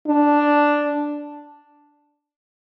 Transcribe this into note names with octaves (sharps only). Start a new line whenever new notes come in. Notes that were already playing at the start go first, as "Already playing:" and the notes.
D4